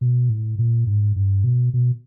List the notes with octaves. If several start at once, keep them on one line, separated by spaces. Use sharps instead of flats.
B2
A2
A#2
G#2
G2
B2
B2